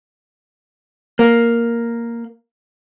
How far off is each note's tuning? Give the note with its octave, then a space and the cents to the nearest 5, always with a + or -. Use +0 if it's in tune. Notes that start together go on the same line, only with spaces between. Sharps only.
A#3 +0